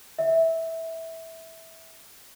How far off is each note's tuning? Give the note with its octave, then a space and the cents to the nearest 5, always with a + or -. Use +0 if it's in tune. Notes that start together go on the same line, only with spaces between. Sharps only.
E5 -15